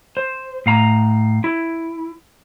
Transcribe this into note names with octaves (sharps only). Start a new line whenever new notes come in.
C5
A2 F5 A#5
E4